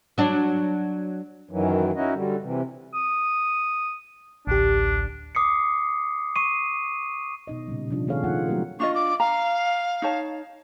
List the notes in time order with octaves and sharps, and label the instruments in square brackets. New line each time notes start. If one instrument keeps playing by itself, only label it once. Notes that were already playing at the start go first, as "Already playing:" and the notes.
[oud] F#3 D4
[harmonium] F#2 D#3 E3 F#3
C#4 D#4 E4 F#4 D#5
D3 F#3 G3
C3 E3
[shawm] D#6
[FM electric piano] A1 D2 G4 [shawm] D4
[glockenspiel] D6 D#6 C7 C#7
C#6 C7 D#7
[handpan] B2 D#4 D#5
A#2 C#3 G3
C3 F3 D4 F4
D#3 A3 G#4 A4 C#5 F5
F3 A#3 C4 D#4 F4 F#5
F#3 A3 A#3 G4 A#4
[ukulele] D4 F4 D#5 [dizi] C#6
[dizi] D6
[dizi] F5 [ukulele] A#5
[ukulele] D#4 C#5 A5